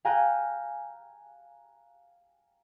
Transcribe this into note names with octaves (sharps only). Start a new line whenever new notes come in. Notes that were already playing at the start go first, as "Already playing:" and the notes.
F5 G5 G#5 A#5 F#6 D#7